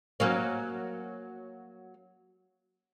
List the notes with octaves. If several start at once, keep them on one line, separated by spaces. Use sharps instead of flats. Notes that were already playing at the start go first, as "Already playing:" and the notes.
F#3 A#3 C#4